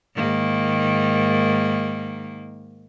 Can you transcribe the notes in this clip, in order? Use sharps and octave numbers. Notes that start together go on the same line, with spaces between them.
G#2 D#3 A#3